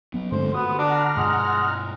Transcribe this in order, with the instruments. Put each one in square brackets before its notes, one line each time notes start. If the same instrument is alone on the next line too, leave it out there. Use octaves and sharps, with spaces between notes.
[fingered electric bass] F#3 B3
[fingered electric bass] G2 G#3 C4 [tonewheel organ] D3 A3 [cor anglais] C5
[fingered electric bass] D3 [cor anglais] B3 [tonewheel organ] F#4 D#6
[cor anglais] D4 [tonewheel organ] F#5 A#5 F6
[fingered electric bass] G2 B2 [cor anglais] G#3